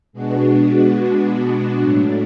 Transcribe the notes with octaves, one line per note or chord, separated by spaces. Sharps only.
B2 G#3 B3 D4 F#4
A2 F#3 A3 D4